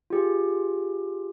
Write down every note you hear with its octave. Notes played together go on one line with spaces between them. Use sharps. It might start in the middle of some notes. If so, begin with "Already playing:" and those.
F4 G4 G#4